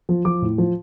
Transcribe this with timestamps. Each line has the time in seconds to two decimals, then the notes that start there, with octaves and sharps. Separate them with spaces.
0.09 F3
0.25 F3 D6
0.42 A2
0.58 F3